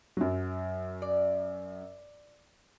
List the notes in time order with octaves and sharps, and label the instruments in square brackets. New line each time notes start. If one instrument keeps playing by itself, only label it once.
[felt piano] F#2 F#3
[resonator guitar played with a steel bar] D5